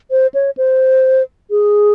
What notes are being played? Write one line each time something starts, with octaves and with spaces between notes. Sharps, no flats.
C5
C#5
C5
G#4